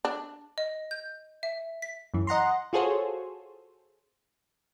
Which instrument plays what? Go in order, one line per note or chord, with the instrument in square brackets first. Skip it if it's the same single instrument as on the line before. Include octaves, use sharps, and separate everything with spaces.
[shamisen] D4
[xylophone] D#5
G6
E5
B6
[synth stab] F#2 E3
D#5 F#5 A#5 C6
F4 F#4 G#4 A4 C5 C#5